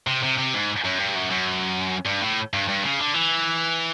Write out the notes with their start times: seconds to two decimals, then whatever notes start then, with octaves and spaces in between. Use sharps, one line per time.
0.07 C3
0.23 C3
0.38 C3
0.54 G#2
0.84 F#2
0.99 G2
1.15 F#2
1.30 F#2
2.06 G2
2.22 A2
2.53 G2
2.68 G2
2.83 C#3
2.99 D3
3.14 E3